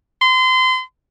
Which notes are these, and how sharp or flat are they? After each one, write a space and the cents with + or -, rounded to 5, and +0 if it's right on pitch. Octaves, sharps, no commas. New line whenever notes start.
C6 -30